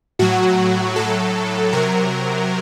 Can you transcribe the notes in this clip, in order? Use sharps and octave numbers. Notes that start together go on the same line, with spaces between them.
A2 F#3 F#4
A2 F#3 A4
C3 F#3 A#4